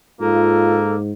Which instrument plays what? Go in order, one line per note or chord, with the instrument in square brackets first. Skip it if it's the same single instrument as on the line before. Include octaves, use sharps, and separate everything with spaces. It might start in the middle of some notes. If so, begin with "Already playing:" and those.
[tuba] G#2 [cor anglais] A#3 [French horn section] F4 [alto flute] A4